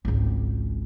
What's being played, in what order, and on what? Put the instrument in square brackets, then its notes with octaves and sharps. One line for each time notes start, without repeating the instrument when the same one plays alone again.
[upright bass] G#1 C#2